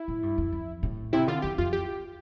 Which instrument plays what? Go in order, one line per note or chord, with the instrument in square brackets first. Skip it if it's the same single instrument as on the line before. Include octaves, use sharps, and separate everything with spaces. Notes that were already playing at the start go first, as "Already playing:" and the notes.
Already playing: [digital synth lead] E4
[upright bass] A2
G2
F2
F2
A2
[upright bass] C3 [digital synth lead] E4
[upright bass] D3 [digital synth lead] F4
[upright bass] E2 [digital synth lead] G4
[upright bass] F2 [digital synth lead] F4
[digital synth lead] G4